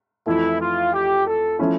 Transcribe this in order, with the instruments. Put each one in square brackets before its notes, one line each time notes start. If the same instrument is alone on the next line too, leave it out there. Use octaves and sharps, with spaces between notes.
[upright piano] F2 E3 A3 [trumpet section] E4
[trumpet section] F4
G4
A4
[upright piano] F3 A3 C#4 E4